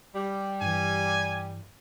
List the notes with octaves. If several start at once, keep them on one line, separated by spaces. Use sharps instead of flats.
G3
G2 E3 G#5